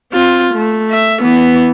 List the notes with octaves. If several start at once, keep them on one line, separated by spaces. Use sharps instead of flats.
C4 F4
A3
E5
E3 B3